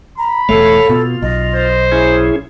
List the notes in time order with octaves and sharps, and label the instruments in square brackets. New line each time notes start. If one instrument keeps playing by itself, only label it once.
[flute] A#5 [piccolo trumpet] B5
[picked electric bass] E1 C#2 A3 [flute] A4 [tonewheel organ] C#5 F5
[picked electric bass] B2 [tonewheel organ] F4
[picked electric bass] B1 [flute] D#5
[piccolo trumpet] C5
[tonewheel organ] C#4 E4 G#4